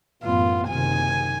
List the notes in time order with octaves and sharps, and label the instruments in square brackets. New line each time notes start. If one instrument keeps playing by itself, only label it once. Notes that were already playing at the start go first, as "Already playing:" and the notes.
[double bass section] A1 F#2 B3 [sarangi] F4
[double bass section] F#1 C3 D#3 [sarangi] G#5